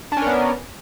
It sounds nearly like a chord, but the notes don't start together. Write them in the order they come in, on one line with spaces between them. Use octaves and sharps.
D4 C#4 A#4 B3